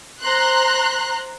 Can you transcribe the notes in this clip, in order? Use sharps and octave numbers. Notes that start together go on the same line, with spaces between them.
C5 A#5 C6 F#6